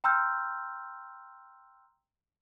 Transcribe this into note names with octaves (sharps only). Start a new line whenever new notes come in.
G5 A#5 C6 E6 F6 G6